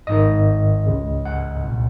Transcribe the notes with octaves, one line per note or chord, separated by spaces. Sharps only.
G#1 G#2 D#3 D#5
C#2 C#3
F#5
C2 A#2